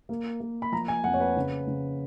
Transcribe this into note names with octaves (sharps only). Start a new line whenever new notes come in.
A#3
A#3
B5
F3 A#5
G#5
F2 F#5
C#5
B4
C#3
C#3